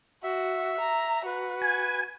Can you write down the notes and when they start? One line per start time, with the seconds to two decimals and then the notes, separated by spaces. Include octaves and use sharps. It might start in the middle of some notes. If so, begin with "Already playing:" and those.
0.23 F#4 E5
0.80 A#5
1.26 F#4 B4
1.61 G#5